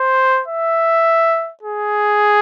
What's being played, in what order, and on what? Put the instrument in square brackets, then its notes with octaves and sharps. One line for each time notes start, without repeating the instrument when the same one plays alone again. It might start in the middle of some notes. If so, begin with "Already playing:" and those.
Already playing: [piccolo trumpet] C5
E5
G#4